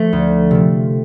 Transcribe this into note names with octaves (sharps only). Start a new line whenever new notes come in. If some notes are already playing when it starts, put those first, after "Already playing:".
Already playing: F3 A3
D2
C3 F3